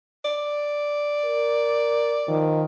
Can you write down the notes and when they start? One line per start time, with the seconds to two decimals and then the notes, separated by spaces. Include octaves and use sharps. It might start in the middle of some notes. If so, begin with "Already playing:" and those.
0.25 D5
1.25 A#4
2.28 D#3 F3